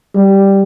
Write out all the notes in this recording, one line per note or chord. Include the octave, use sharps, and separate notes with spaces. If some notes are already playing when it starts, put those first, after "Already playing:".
G3